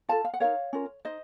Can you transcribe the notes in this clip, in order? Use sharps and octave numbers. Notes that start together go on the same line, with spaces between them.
F4 A4 F5 A5
F5
F#5
D#4 A#4 C#5 F5
C#4 F4 A#4
D#4 C5 D#5